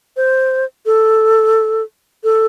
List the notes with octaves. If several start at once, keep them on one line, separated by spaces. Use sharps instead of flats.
C5
A4
A4